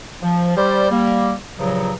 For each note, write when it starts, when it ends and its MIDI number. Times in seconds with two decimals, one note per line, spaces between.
0.22 0.54 53
0.57 0.89 55
0.57 0.89 72
0.57 0.89 74
0.91 1.33 55
0.91 1.33 58
1.59 1.93 43
1.59 1.93 46
1.59 1.93 49
1.59 1.93 53
1.59 1.93 54